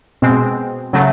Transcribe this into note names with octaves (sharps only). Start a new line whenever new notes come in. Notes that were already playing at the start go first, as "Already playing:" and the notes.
B2 G#3 C4
C#3 F#3 A3